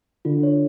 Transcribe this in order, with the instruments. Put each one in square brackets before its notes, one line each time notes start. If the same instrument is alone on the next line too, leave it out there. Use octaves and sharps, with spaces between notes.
[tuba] D3 [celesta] F4
[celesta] C#5